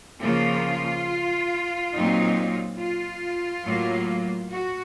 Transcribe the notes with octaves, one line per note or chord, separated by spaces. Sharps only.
C#3 F3 A#3 F4
A#2 F#3 C4 D#4
F4
A2 F#3 A#3
F#4